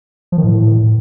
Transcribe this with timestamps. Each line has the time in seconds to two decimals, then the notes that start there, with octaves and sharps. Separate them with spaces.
0.32 F3
0.38 D#3
0.44 A2